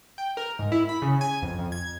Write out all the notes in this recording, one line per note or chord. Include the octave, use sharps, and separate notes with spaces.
G5
A#4
G#2
E4
B5
C#3
G#5
F2
F2
G#6